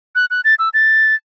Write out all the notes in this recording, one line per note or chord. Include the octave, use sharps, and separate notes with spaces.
F#6
F#6
A6
E6
A6